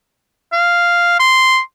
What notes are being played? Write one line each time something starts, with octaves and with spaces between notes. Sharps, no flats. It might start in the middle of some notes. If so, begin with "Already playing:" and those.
F5
C6